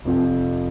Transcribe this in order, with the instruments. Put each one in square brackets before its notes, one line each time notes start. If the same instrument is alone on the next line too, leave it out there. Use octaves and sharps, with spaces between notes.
[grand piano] F1 F2 F3